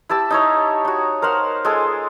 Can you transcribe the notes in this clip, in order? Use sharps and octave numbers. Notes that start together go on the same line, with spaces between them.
E4 G4 A5 E6
D#4 E4 C#5
D#4 F#4
A#4 C5 F5 F#5
G#3 F4 A4 G#5